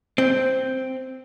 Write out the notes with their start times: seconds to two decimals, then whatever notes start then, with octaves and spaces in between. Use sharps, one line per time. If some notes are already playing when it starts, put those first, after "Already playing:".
0.18 C4